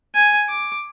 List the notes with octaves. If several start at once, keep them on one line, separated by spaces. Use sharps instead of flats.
G#5
D6